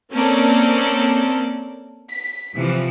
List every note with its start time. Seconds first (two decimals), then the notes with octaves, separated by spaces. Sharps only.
0.12 A#3 C4 C#4 A4 A#4 D5
2.09 B6
2.55 C3 E3 F3